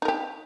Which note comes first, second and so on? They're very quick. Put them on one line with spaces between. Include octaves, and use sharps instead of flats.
D#4 A#4 G4